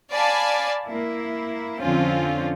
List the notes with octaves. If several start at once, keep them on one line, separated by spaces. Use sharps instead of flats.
D5 F5 G#5 A5 B5
A#3 E4
F2 D3 C4 C#4 F4